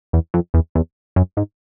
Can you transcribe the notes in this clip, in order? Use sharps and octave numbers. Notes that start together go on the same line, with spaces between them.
E2
F2
E2
E2
F#2
G#2